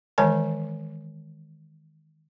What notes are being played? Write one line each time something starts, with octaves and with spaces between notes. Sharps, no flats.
D#3 E3 G#3 C#5 G#5 A5